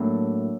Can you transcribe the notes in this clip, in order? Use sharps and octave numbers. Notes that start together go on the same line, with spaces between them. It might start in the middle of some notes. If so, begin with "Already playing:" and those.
Already playing: A2 F#3 A#3 D4